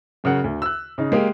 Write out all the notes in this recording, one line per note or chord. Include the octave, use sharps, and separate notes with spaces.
F#2 C#3 A#4 F#5
D2
E6 F#6
C#3 D#4
G#3 A#3 G4